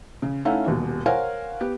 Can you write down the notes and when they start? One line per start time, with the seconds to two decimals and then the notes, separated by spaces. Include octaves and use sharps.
0.22 C#3
0.45 A3 C#4 D#4 E4 F5 F#5
0.66 D#1 D#2 B2
1.06 A#4 C5 C#5 F5 F#5 G#5
1.60 B3 G4